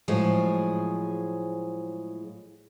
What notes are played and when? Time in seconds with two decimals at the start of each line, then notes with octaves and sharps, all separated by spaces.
0.08 A2 F3 F#3 G#3 G#4